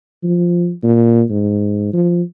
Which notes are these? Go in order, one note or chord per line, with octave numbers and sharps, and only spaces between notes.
F3
A#2
G#2
F3